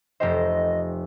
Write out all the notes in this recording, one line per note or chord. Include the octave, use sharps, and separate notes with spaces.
F1 G4 C5 D#5